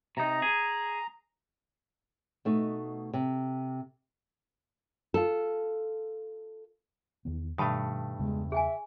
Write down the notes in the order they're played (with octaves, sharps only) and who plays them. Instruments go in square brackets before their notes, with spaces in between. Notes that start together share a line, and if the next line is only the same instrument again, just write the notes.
[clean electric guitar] C3 D#4 [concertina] A#5
[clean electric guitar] G#4
[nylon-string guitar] B2 A3 D#4
C3
F4 A4
[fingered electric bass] E2 D#3 B3
[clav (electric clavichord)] G2 A3 [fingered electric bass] B2 D#3 [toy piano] A5 B5 D#6
[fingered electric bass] E2 C#3 B3 [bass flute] G#3
[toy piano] G#4 G5 G#5 [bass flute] E5